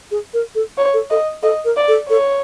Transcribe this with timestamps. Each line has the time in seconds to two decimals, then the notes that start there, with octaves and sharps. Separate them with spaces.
0.11 G#4
0.34 A#4
0.55 A4
0.78 C#5
0.94 A4
1.10 A4 D#5
1.43 A4 D#5
1.65 A#4
1.76 D5
1.88 A4
2.10 A4 C#5